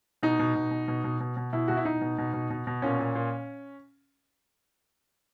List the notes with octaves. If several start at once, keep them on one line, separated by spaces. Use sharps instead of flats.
B2 D#4
B2
B2
B2
B2
B2
B2
B2
B2 E4
B2 F#4
E4
B2 D#4
B2
B2
B2
B2
B2
A#2 C#4
A#2
A#2